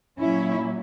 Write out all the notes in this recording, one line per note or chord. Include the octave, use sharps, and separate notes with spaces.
A#2 F#3 C#4 E4